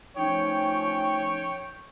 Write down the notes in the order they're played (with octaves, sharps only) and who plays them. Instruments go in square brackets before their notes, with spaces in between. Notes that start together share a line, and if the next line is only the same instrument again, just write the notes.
[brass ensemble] F3 A3 C#4 [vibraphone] D#4 [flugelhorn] C#5 [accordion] G5